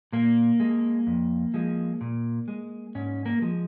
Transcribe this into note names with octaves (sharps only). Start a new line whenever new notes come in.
A#2 A#3
G#3
F2
F3 G#3
A#2
G#3
G#2 C#4
A#3
F3 G#3